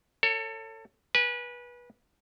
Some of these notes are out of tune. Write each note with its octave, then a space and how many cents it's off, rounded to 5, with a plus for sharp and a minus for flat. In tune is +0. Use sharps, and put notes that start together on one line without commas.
A4 +30 C#5 +0
B4 -25 G#5 +0